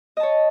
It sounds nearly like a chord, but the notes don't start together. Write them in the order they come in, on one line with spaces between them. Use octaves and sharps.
D#5 A5 C#5